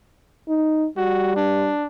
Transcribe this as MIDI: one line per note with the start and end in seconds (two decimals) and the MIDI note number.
0.48 0.87 63
0.97 1.71 55
0.97 1.33 66
1.36 1.86 62